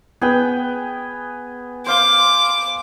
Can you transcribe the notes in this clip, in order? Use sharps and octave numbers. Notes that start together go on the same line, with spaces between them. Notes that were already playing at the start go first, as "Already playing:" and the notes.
B3 G#4 B4 G5
C5 F5 C6 D6